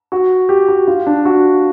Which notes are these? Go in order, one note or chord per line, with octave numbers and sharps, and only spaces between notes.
F#4
G4
F#4
F4
D4
F#4